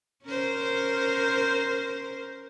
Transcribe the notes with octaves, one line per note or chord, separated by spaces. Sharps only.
C#4 A#4 C5